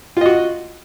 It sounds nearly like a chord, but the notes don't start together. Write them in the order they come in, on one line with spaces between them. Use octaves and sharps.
F4 D#5 F#4